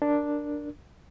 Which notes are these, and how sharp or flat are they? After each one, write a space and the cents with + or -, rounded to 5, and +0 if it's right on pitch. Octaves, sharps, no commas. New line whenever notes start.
D4 +0 A#4 +0